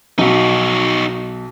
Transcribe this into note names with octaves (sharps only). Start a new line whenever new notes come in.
B1 D#4 F#4